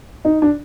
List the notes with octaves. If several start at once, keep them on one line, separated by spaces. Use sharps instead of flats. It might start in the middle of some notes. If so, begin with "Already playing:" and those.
D#4
D4